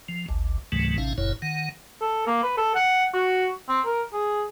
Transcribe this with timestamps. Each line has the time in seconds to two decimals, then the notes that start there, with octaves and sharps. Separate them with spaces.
0.09 F3
0.29 G#1 D2
0.72 C#2 G#2 C3 E3 F#3 A3
0.98 A1 A2 C3 C#4 D#4 F5
1.18 F#1 F#2 A#2 E4 C#5
1.42 D#3 F#5
2.01 A4
2.27 A#3
2.43 B4
2.57 A4
2.75 F#5
3.14 F#4
3.69 C4
3.86 A#4
4.13 G#4